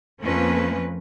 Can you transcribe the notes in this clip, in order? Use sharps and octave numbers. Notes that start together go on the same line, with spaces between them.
F2 F3 A3 A#3 C#4 B4